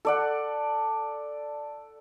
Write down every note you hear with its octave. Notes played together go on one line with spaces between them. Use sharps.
A4 D5 F#5